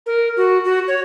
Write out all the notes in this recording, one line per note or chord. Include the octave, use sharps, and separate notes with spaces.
A#4
F#4
F#4
C#5